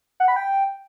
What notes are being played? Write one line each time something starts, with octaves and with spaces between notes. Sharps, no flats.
F#5
B5
G5